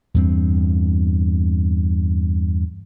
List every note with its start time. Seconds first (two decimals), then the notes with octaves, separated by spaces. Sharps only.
0.14 E2 G2 C4